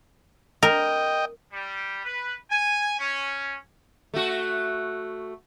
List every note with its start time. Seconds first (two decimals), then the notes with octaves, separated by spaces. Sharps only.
0.63 A#4 D#5 G5
1.52 G3
2.04 B4
2.49 G#5
2.99 C#4
4.14 A3 F#4